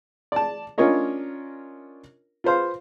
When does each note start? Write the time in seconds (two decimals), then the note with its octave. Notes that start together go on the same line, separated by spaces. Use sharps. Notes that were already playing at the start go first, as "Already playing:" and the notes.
0.32 D5 A5
0.78 C#4 D4 F4 A#4 C#5 D#5
2.44 F4 B4 C5 F5